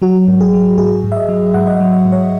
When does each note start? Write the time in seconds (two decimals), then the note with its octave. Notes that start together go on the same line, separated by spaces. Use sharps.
0.02 F#3 F#4
0.28 G#2
0.41 G#4
0.53 F#3
0.78 G#2 G#4
1.04 G#2
1.12 E5
1.17 D#5
1.29 F#3
1.54 G#2 F#5
1.67 D#5
1.74 E5
1.80 F#3
1.93 D#5
2.05 G#2
2.12 C#5